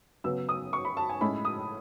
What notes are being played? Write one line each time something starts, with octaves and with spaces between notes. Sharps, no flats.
C#3 F#3 B3 E6
D#6
C#6
B5
A5
G#5
A2 G#3 C#4 E4 B5
D#6